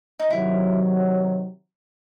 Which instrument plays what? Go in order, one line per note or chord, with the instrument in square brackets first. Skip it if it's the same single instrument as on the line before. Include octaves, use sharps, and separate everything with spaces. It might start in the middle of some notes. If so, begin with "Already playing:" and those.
[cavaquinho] D#4
[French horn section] C3 D#3 F#3 [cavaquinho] E4